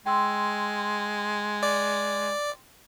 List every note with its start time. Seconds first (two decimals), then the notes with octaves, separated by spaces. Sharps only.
0.06 G#3 G5 C6 E6
1.63 D5